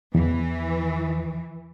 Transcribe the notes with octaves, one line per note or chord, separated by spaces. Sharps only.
E2 E3